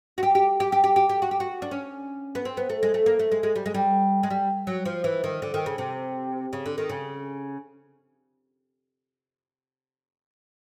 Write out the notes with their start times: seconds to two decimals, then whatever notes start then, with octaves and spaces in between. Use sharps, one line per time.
0.18 F#4
0.23 G4
0.35 G4
0.60 G4
0.72 G4
0.84 G4
0.96 G4
1.09 G4
1.22 F#4
1.31 G4
1.40 F#4
1.62 D4
1.71 C#4
2.35 B3
2.45 C4
2.57 B3
2.70 A3
2.83 G#3
2.94 A3
3.06 A#3
3.19 A3
3.32 G#3
3.43 G#3
3.56 G3
3.66 G#3
3.74 G3
4.23 G#3
4.30 G3
4.67 F#3
4.85 F3
5.04 E3
5.24 D#3
5.42 D3
5.54 D#3
5.66 C#3
5.78 C3
6.53 C#3
6.66 D3
6.78 D#3
6.89 C#3